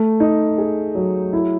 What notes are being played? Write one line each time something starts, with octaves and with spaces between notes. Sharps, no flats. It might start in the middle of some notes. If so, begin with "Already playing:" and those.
Already playing: A3
D#4
G#4
F#3
E4